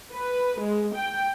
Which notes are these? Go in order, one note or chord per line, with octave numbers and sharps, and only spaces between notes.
B4
G#3
G5